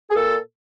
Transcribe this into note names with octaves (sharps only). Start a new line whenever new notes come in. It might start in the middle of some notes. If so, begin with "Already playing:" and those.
G#4
A#2 A4